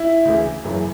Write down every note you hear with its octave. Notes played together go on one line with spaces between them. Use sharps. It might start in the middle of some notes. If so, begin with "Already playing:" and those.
Already playing: E4
D2 C#3 E3
F#1 F#2 C#3 E3